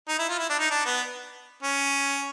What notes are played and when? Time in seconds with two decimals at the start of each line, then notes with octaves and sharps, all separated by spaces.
0.08 D#4
0.18 E4
0.29 F4
0.39 E4
0.50 D4
0.59 D#4
0.71 D4
0.86 B3
1.63 C#4